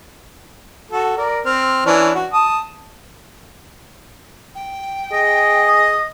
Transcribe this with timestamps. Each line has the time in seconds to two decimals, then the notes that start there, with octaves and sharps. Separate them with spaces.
0.91 F#4 A4
1.17 A#4 D5
1.45 C4 F6
1.86 E3 C#4 D4
2.15 F#4
2.33 A5 D#6
4.55 G5
5.13 G#4 D#5
5.67 D#6